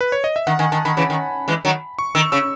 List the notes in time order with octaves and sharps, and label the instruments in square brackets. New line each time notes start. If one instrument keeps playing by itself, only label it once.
[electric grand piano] B4
C#5
D#5
E5
[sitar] D#3 [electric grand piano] F#5
[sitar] D#3 [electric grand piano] G#5
[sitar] D#3 [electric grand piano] A5
[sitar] D#3 [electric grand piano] B5
[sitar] C#3 E3 [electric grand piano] B5
[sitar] D#3
E3 G#3
D#3 F#3
[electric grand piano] C#6
[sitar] D#3 [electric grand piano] E6
[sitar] C#3 [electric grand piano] E6